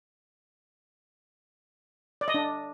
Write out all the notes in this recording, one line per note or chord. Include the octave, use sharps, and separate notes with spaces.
D5
D#5
D4